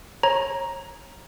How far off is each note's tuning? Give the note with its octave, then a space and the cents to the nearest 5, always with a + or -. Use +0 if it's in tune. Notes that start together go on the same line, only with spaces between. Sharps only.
C#5 -25 A#5 +10